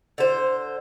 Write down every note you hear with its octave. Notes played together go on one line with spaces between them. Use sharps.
D3 C5